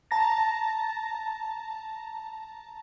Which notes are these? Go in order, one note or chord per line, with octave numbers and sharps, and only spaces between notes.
A5 A#5 A6 A#6